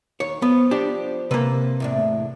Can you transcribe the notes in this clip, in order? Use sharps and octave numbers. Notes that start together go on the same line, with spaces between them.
D#2 C#5
F3 B3
D4 G4
C3 A#3 B4
E2 A2 D4